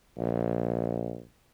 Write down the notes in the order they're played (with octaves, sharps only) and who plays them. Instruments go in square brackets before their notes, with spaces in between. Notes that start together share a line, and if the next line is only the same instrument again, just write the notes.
[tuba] A#1